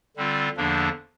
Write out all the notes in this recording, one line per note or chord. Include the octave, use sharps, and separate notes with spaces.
D3 G3 C4 F4
E2 D3 F3 A#3 D4